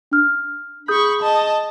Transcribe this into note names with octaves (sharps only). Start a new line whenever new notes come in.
D4 F6
G#4 B5 C#6 D#6 G6
D#5 A5